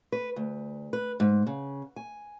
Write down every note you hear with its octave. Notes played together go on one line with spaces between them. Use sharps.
B4
D2
B4
G#2
C#3
G#5